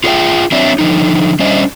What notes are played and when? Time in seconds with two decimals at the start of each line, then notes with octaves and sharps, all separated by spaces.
0.04 F4 F#4 G#4 C#5 E5 G5
0.52 F#3 C4 D4 C#5 D5 E5
0.79 D3 F3 D#4
1.39 G3 C#4 D4 C5 D#5 E5